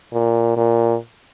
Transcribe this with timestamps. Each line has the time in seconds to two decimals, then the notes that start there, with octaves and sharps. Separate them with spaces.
0.13 A#2
0.56 A#2